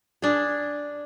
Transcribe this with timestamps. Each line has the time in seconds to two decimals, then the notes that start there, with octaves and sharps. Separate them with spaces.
0.22 D4 G#4